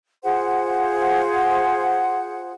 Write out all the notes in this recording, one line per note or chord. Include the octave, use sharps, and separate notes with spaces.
F4 G#4 C5 F#5